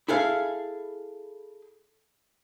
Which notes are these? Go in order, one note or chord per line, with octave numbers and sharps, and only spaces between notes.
E4 G#4 A4 F5